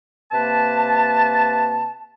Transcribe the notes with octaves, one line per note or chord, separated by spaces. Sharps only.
C3 A#3 B4 A5